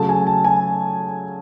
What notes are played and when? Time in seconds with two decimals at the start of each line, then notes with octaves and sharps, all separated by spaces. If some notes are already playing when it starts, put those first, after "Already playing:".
Already playing: C#3 F#3 A3 A5
0.09 G#5
0.27 A5
0.44 G#5